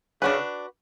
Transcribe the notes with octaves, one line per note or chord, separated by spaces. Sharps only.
C#3 D4 F#4 B4